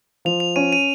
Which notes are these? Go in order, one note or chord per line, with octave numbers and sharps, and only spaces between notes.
F3 F7
F7
C#4 D#7
D#7